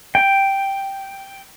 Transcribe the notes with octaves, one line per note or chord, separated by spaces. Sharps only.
G5